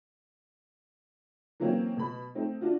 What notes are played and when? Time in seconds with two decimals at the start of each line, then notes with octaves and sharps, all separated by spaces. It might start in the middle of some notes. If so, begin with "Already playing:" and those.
1.60 E3 F#3 A#3 C4 C#4
1.97 B2 B5
2.35 A3 C4 D#4
2.61 D4 F4 F#4